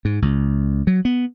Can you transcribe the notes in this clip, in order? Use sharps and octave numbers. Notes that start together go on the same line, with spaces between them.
G#2
C#2
F#3
B3